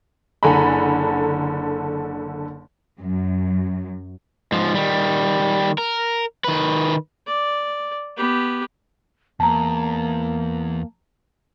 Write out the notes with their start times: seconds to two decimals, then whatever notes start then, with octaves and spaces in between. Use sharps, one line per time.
0.43 F#1 D3 A4 G#5 A#5 B5
3.01 F#2
4.52 G#2 F3
4.75 D#3 G3
5.78 A#4
6.44 D#3 B4
7.27 D5
8.17 B3 G4
9.40 E2 A#3 A5 A#5